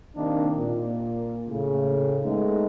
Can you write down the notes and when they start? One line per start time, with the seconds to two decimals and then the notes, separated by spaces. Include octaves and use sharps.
0.16 C3 D#3 A#3 C4 D4
0.57 A#2
1.47 A2 C#3
2.22 G#3 A3 B3 D#4